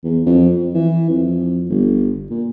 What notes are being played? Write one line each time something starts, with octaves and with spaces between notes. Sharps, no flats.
E2
F2
F2
E3
F2
G1
A#2